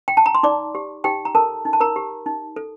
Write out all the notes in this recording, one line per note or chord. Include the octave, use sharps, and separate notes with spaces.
G5
A5
A#5
C6
D#4 D5 D6
G4
D#4 G4 G5
A#5
A4 A#4 A5
D#4
A5
A#4 A#5
G4
D#4
A4